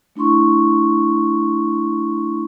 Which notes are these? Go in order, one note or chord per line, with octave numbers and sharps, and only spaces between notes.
A3 D4 E4 C6 C#6